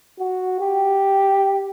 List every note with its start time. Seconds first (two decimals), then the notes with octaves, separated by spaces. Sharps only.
0.19 F#4
0.60 G4